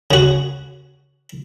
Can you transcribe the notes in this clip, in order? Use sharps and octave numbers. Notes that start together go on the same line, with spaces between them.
C#3 F#4